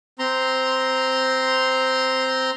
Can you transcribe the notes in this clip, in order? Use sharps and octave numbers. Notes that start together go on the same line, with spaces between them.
C4 A#5 C6